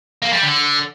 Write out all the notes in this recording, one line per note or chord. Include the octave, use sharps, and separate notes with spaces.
A#3
G3
D3